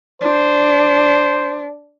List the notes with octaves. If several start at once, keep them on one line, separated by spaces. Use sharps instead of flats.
D4 C5